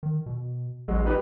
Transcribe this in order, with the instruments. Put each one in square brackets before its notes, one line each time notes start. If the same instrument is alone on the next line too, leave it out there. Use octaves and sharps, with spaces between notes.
[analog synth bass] D#3
B2
[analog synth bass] A1 [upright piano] F#3 G#3
[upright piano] D#4 G4 B4